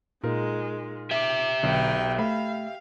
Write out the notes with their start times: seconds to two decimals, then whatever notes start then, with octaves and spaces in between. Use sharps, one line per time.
0.24 A#2 G#3 D#4 F4 A#4
1.11 G4 E5 D6
1.63 B1 D3 B4 G5
2.19 A3 F5 B5